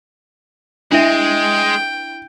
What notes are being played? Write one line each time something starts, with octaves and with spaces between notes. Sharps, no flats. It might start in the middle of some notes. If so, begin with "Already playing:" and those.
G#3 D4 E4 E5 G5